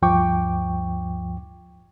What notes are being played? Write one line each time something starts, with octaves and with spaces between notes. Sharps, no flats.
D2 G2 F3 G5 C#6 D6